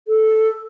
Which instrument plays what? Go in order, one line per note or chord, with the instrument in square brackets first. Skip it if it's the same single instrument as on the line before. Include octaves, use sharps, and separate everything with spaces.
[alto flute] A4